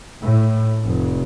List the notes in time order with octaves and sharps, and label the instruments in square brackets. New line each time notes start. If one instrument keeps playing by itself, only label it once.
[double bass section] A2
F1